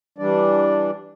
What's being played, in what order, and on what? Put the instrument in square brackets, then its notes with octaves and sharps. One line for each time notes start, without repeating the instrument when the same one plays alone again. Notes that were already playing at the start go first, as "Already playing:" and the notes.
[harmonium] E3 G3 D4 D5